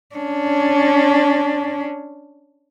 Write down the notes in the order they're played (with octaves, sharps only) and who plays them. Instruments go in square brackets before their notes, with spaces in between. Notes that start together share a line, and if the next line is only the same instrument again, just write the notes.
[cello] C#4 D4